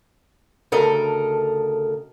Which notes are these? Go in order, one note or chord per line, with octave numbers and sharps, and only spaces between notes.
D2 C#3 A4 A#4 D#5